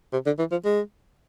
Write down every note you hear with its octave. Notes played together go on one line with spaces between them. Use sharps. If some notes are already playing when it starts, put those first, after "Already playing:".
C3
D3
E3
F3
G#3